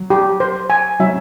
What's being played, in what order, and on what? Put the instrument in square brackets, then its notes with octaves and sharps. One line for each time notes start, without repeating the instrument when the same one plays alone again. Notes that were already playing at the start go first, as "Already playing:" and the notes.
Already playing: [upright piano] F#3
[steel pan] G4
C5
G#5
[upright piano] F#3 [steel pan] E5